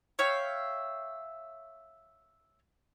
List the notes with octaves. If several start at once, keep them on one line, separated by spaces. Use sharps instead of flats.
C#5 E5 F5 G5